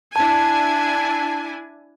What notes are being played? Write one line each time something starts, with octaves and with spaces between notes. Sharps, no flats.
D4 E4 G#5 A5